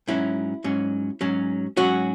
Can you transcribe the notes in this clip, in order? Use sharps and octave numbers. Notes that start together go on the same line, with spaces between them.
G#2 F#3 C#4 E4
G#2 F#3 C#4
G#2 F#3 C#4
G#2 F#3 C#4 F#4